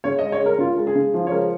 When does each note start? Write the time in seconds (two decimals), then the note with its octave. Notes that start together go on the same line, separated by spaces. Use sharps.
0.04 C#3 C#5
0.19 D#5
0.22 G#3
0.32 C#5
0.41 G#3 A#4
0.58 C#3 F4
0.77 G#3
0.87 G#4
0.95 C#3
1.14 F3
1.27 C#5
1.32 G#3 A#4